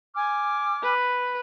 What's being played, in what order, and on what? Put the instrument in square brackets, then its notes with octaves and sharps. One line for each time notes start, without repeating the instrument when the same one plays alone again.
[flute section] G#5 D6 F6
[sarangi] B4